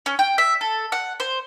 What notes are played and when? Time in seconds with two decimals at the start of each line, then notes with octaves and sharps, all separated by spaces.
0.06 C#4
0.19 G5
0.38 E5
0.61 A4
0.92 F#5
1.20 C5